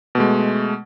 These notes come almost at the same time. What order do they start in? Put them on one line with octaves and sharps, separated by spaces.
B2 A3 G#3